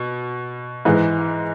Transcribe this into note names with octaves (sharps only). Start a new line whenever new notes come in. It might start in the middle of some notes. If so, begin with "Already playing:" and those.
Already playing: B2
G#2 E3 G#3